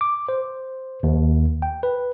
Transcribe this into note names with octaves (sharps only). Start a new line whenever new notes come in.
D6
C5
D#2
G5
B4